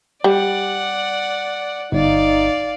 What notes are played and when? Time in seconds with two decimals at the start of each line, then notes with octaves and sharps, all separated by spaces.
0.24 G3 D5 F#5
1.92 G1 D#4 D5 F5